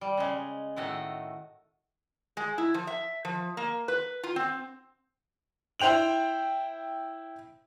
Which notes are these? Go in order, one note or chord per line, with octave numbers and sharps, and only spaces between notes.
G3
C#3 G#3
A2 D#3 A3 F#4 D#5
G#3
E4
F3
E5
F3
A#3
B4
F4
C4
E4 C5 G5 F7 F#7